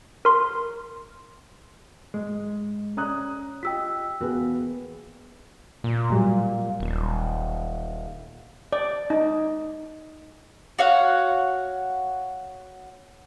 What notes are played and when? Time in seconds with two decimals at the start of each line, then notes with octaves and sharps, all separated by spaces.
0.25 A#4 C6
2.14 G#2 G#3
2.97 C#4 D5 A#5 D#6 F#6
3.63 F4 G4 D#5 G5 E6 B6
4.20 E2 A#3 B3 F#4 G#4
5.84 A#2
6.10 A2 F#3 G3
6.80 D#1
8.73 D5
9.10 D#4
10.79 F#4 C#5 F5 F#5